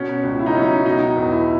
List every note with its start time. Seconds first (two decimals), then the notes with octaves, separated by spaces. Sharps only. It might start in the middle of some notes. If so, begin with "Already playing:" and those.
Already playing: B2 C#4
0.23 C#2
0.39 E4
0.46 D#4
0.55 F#3 C#4
0.62 D#4
0.85 B2 D#4
1.17 E2
1.32 E4